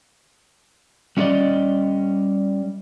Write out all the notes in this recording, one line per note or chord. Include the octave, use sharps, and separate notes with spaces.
G3 C#4 D#4 G#4 D5 D#5